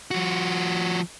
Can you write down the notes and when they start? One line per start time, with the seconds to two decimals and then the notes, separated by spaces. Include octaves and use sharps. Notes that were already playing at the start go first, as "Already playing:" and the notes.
0.11 F3 F#4